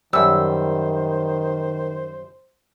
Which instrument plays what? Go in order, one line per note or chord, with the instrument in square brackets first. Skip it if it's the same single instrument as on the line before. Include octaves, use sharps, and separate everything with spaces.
[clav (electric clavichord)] F#2 G3 [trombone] D#3 [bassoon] C5 [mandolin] E6